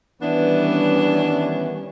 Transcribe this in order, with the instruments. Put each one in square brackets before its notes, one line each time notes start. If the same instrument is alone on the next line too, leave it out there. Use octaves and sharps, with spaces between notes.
[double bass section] D#3 G3 C#4 [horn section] E3 B3 [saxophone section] D4